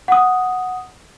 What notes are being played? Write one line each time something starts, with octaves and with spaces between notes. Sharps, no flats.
F#5 D#6